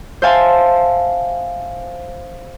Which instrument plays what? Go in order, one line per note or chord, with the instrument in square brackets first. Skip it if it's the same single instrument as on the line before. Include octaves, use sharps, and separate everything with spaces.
[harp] C5 E5 F5 G#5 A5 C6